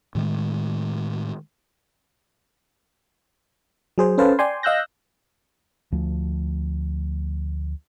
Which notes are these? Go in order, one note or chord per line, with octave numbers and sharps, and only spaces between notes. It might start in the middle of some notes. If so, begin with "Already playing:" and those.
A2 D#3 G#3
F#3 G#4 C5
C#4 A4 B4 C5 F5 A5
D5 G5 G#5 C6
D#5 F5 E6 F#6 G6 A#6
D2 F3 A3